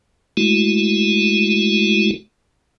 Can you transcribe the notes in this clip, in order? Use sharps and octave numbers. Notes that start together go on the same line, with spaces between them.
G#3 A3 E4 F#4